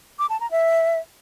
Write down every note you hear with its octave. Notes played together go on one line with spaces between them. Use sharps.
D6
A5
A#5
E5